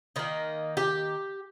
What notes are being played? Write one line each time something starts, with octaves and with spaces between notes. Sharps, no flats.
D#3 A#3 D#4
G4